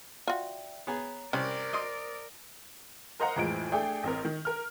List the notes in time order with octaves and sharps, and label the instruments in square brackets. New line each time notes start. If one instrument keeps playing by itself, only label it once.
[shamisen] F4 F#4 [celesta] D5 E5 G5
[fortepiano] B3 G#4 [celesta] C#5 A#5
[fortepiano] C2 [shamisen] C#4 [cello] A#4 D5 [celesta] C5
[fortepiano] D#5 C6 D#6
[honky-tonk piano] A#4 C5 D#5 F5 F#5 A#5
F2 A2 E3 F3 G#3 D7
A3 D4 G#4 D5 G5
A1 C4 A#4
D#3
A#4 F6